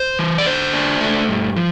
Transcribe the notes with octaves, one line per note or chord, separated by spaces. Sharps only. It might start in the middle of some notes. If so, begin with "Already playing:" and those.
Already playing: C5
E3
D5
D3 C5
D4
A3
G2
F3